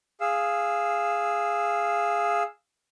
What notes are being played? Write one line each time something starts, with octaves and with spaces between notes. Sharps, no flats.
G#4 F5 E6